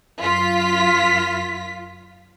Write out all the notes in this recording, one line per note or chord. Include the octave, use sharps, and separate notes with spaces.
F#2 F4 B6